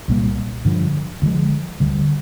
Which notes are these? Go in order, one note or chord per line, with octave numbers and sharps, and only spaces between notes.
C2 A#2 G3 A#3
G2 D3 F3
D2 D3 F3 G#3
D2 D3 G3